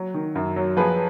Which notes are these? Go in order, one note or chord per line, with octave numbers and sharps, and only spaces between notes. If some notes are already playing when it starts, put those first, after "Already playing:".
Already playing: F#3
D#3
F#2
F#3
F3 G#4 B4